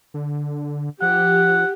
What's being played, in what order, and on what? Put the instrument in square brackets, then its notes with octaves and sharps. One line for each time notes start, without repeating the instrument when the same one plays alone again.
[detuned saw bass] D3
[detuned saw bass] F3 [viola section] G4 [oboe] F#5